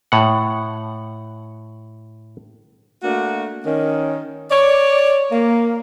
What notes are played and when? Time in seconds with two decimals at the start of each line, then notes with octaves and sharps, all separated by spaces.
0.12 A2 F#5
3.02 A3 A#3 D4 F#4
3.65 D#3 C#4
4.50 C#5 D5
5.32 A#3